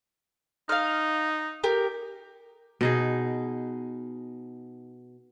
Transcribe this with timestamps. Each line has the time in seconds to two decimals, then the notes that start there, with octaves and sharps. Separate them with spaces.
0.69 D#4 F5 F6
1.64 G4 A#4
2.81 B2 D#4 G#4